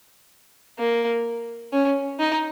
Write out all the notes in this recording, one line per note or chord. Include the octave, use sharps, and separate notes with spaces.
A#3
C#4
D#4